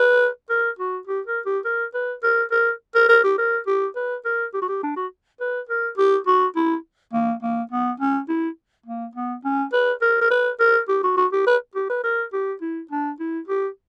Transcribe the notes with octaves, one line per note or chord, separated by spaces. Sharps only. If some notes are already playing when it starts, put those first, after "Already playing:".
Already playing: B4
A#4
F#4
G4
A#4
G4
A#4
B4
A#4
A#4
A#4
A#4
G4
A#4
G4
B4
A#4
G4
F#4
G4
D4
F#4
B4
A#4
G4
F#4
E4
A#3
A#3
B3
C#4
E4
A#3
B3
C#4
B4
A#4
A#4
B4
A#4
G4
F#4
F#4
G4
B4
G4
B4
A#4
G4
E4
D4
E4
G4